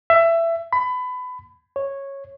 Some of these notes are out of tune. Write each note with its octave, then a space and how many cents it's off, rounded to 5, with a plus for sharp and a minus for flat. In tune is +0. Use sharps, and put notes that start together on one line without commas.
E5 +20
B5 +25
C#5 -10